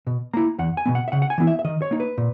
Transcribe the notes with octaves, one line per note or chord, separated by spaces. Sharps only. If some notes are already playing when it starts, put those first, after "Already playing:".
B2
A#3 E4 A#5
E2 F#5
G#5
B2 F#3 B3
F#5
E5
C#3 F#5
F#5
G#5
E3 B3 E4
E5
E5
D#3 D#5
C#5
A#3 D#4
B4
A#2